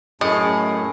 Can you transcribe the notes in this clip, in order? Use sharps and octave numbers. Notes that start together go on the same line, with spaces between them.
F#2 A2 A3 G#4 D#5